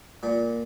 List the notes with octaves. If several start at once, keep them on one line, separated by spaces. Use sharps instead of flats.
A#2